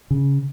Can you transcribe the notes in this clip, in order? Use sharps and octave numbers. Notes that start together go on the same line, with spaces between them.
C#3